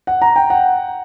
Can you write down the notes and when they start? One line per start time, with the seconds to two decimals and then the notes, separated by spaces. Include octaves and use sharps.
0.07 F#5
0.22 A#5
0.36 G5
0.50 F#5